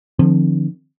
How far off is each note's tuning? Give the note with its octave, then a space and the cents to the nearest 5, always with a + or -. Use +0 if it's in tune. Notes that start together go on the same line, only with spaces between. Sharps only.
D3 +45 F3 +0 C4 +5